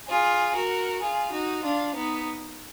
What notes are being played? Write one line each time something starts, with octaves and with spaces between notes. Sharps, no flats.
F4 G#4
F#4 A#4
F4 G#4
D#4 F#4
D4 F4
B3 D#4